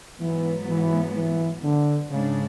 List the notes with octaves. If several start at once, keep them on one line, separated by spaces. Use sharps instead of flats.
G#2 E3 F#3 B3
E3
E3
D3
G#2 C#3 G#3 D4